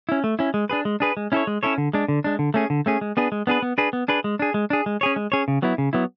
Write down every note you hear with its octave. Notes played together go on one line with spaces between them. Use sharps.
C#4 E4
A3
C#4 E4
G#3
D4 G#4 B4
G#3
D4 G#4 B4
G#3
C#4 E4 A4 C#5
G#3
C#4 E4 A4 C#5
D3
G#3 D4
D3
G#3 D4
D3
A3 C#4 G#4
D3
A3 C#4 G#4
G#3
B3 D4 G#4 B4
G#3
B3 D4 G#4 B4
B3
D4 G#4 B4
B3
D4 G#4 B4
G#3
D4 G#4
G#3
D4 G#4
G#3
C#4 G#4 C#5
G#3
C#4 G#4 C#5
C#3
F#3 B3 E4
C#3
F#3 B3 E4